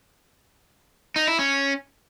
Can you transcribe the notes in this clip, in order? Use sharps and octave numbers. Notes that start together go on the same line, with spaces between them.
D#4
E4
C#4